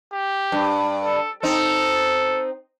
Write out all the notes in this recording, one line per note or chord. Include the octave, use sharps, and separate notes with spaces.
G4
G2
A4
C4 D#4 A4